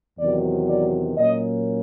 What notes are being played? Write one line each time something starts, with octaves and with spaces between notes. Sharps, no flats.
E2 C3 D#3 F#3 D5
D5
A#2 F#3 A#3 C#4 D#5